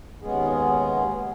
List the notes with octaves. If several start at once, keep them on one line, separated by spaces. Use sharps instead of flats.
D#2 G#3 B3 C#4 G#4